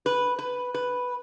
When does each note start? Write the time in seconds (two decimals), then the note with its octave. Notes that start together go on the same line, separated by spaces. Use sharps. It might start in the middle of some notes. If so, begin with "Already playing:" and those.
0.06 B4
0.39 B4
0.74 B4